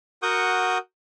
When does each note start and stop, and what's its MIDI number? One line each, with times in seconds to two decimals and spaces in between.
0.23 0.78 66
0.23 0.78 70
0.23 0.78 78
0.23 0.78 85
0.23 0.78 87
0.23 0.78 91